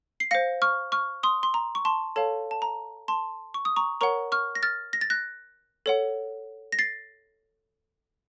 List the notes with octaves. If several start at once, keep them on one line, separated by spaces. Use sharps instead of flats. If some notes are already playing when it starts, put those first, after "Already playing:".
C7
C5 F5 A#6 C#7
C#6 F6
C#6 F6
C6 D#6
C6
A#5
C#6
A5 C6
A4 C#5 F5 A5
A5
A#5
A5 C6
C#6
D#6
A#5 C#6
A#4 C#5 F#5 A#5 C#6
C#6 F6
A#6
F6 A6
A#6
A6
F#6 A#6
A4 C#5 F#5
A#6
A6 C7